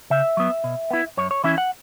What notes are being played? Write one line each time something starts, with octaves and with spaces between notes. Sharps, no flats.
C#3 E5
F#3 B3
B2
B3 E4
F#2 C#5
C#5
E3 C#4 E4 E5
F#5